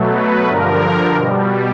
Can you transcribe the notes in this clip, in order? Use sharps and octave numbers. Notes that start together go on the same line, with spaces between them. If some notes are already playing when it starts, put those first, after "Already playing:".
Already playing: B2 F#3 A3
B4
G2 D3 F3 A#4
B2 G3